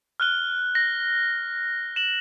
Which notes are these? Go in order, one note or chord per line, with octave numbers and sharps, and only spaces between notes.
F6 F#6 G7
A#6
E7 F#7